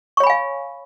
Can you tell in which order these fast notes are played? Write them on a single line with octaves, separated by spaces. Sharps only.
C#6 C#5 B5 G#5 F5